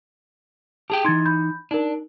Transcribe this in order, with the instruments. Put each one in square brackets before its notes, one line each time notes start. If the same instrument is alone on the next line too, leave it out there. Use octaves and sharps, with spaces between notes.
[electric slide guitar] G4 G#4 G5 [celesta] A5
[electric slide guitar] E3 D#4 [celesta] C6 G#6 A6
[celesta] B5 G6
[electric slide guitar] D4 [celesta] D#4 A#4